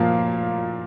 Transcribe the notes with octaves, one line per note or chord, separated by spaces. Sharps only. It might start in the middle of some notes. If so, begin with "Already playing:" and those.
Already playing: A#2 F3 A#3 F5